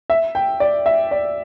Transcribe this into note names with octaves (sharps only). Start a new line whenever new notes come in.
E5
G5
D5
E5
D5